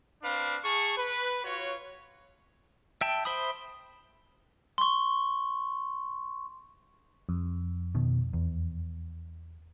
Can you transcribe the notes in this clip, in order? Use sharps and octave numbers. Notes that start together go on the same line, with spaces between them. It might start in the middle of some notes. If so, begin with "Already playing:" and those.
C4 D4 B4 F5
G#4 A5 C#6
B4
F4 F#4 C#5
E5 G5 A5
C5 E5 B5 D#6
C6 C#6
F2
B2 D#3
E2